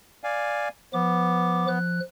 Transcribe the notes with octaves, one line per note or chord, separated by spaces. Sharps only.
D5 F5 G#5
F3 B3 D6
F3 F#6